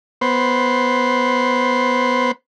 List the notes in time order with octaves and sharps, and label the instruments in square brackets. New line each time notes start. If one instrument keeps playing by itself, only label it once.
[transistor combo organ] B3 C5